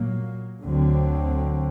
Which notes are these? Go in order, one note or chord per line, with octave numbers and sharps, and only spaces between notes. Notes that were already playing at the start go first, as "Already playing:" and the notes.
Already playing: A#2 F#3 A#3
D2 D3 F#3 C4